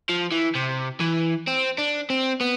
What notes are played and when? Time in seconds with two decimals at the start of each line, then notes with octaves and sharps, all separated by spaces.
0.09 F3
0.32 E3
0.55 C3
1.01 E3
1.48 C4
1.78 D4
2.10 C4
2.41 B3